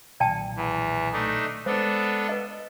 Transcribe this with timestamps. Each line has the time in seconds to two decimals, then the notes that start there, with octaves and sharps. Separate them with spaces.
0.20 B1 A#2 D#3 D5 G5 A5
0.56 E2 E3
1.13 A3 D4 D#4
1.66 G#3 B3 D4 A4 C5
2.29 B4 D#5